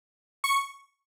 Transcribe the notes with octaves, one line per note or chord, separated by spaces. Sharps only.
C#6